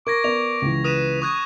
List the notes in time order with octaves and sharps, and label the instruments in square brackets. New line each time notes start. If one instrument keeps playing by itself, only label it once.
[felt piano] A#4 [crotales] C#6 G#6 A#6 [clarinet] D6
[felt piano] B3 A#4 D5 [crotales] F7
[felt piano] C#2 E3
[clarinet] B4 [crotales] D#6 D#7 E7
[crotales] C#6 F#6 G#6 [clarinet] D#6